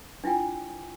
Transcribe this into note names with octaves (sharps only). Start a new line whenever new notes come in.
D4 E4 F4 G5 G#5